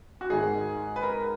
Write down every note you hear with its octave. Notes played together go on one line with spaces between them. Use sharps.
F#4
G#2 D#3 G#3 G#4
B4
A#4